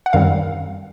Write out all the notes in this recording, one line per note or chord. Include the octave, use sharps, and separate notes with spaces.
F#5
F#2 D#3 G3 C4 F5